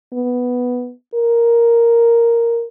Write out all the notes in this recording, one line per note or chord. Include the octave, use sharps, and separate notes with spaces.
B3
A#4